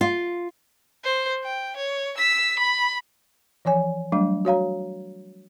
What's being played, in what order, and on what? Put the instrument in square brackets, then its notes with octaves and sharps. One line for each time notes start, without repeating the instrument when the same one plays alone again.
[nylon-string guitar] F4
[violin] C5
G5
C#5
E6 B6
B5
[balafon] E3 F3 C#5 G#5
F#3 G3 A3 D4
F#4 C#5 F5 A#5